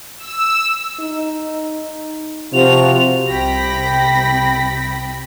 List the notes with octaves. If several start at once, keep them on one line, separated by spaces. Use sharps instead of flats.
E6
D#4
C3 F3 F4 F#4 C5 F7
C2 C3 G5 B5 A#6 B6